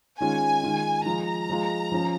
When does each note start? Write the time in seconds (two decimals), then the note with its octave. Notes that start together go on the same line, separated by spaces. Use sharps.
0.19 D#3 G#3 C#4 F4 G#5
0.63 D#3 G#3 F4
1.06 F3 G#3 F4 A#5
1.49 F3 G#3 F4
1.92 F3 C#4 F4